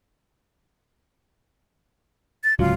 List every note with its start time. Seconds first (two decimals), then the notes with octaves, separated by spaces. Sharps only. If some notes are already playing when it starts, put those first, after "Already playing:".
2.44 A6
2.59 D1 C#2 F#3 F4